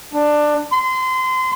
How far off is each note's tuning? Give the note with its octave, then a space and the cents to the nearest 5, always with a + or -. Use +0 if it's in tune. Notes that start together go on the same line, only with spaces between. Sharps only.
D4 +15
C6 -25